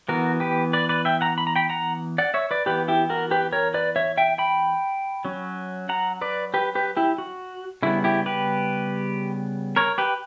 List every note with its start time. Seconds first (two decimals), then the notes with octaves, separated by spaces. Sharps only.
0.08 E3 B3 F#4 A#4
0.40 G4 B4
0.73 B4 D5
0.89 B4 D5
1.05 E5 G5
1.21 F#5 A#5
1.38 B5
1.47 A#5
1.56 G5 B5
1.70 F#5 A#5
2.18 D5 F#5
2.34 C#5 E5
2.51 B4 D5
2.66 E3 B3 G4 B4
2.88 E4 G4
3.10 F#4 A#4
3.31 G4 B4
3.52 A#4 C#5
3.74 B4 D5
3.96 C#5 E5
4.17 E5 G5
4.38 G5 B5
5.25 F#3 C#4
5.89 F#5 A#5
6.21 B4 D5
6.54 G4 B4
6.75 G4 B4
6.97 E4 G4
7.18 F#4
7.83 C#3 G3 B3 E4
8.04 E4 G4
8.26 G4 B4
9.76 A#4 C#5
9.98 G4 B4